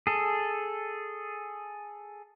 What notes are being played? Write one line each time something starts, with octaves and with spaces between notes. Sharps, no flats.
G#4 A4